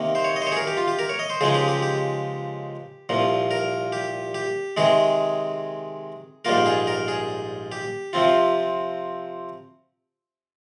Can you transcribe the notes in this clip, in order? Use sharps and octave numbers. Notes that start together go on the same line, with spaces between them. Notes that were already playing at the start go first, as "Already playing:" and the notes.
Already playing: C3 D#3 A#3
C5
C#5
D#5
C5
C#5
G#4
A#4
G4
F4
G4
A#4
C#5
D#5
C5
C#2 C#3 F3 G#3 D#4 G#4
G4
G4
G4
C2 A#2 F3
A#4
G4
G4
C3 D#3 G#3 G#4
A#1 G#2 G3 A#3 F4 A#4
G#4
A#4
G#4
G4
C3 F3 C4 F4